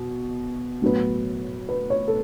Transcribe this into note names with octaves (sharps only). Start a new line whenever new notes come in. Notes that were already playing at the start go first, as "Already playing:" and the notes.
Already playing: B2
A2 F#3 B3
B4
C#5
A4